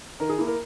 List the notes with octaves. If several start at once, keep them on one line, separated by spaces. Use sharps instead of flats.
D#3 A#4
G#4
A#3 E4
A#4